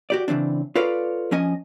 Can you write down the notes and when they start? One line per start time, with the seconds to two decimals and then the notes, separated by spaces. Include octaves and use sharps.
0.10 F#4 G4 D5
0.28 C#3 E3 C4 D4
0.75 F4 A4 B4 C#5 D5 F5
1.31 F2 F3 C#4 D#5 G#5